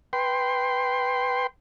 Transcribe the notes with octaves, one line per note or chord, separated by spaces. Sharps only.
B4 G5 C6